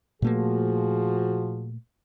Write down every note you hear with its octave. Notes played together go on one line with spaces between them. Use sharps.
A#2 F3 A3 A#3 F#4 G#4